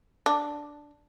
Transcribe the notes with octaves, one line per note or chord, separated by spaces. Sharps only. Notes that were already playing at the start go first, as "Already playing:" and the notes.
D4